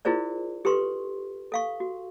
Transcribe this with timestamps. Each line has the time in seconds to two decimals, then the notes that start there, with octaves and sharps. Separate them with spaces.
0.05 E4 F4 G#4 A#4 C5 D5
0.65 G4 A4 B4 C6 C#6
1.52 A4 F5 C#6
1.80 F#4